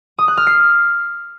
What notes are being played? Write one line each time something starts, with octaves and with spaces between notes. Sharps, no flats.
D#6
F#6
F6
C7